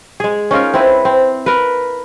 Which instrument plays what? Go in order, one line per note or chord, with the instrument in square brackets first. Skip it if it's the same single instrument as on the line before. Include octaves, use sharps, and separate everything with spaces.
[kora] G#3 G#4
C#4 D#4 F4 A#4
C4 E4 B4
C4
A#4 B4